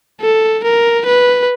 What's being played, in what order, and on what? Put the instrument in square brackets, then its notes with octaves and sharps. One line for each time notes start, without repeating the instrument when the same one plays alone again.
[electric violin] A4
A#4
B4